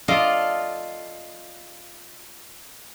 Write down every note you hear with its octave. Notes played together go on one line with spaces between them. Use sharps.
F4 A4 D5 D#5 F5